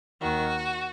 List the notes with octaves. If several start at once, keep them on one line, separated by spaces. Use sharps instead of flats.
D#2 D#3 F#4